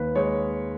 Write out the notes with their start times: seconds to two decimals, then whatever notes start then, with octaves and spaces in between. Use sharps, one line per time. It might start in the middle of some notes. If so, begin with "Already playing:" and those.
Already playing: D#2 B4
0.16 G#3 C#5